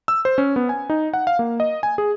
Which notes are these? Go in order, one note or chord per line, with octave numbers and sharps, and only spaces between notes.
E6
C5
C#4
B3
G#5
D#4
F#5
F5
A#3
D#5
G#5
G#4